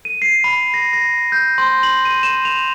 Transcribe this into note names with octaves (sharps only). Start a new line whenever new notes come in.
D#7
C7
B5
A#6
A#6
G6
C6
F#7
D#7
E7
F7